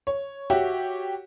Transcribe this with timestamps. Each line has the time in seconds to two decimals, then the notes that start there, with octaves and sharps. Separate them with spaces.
0.07 C#5
0.50 F#4 G4 C#5 E5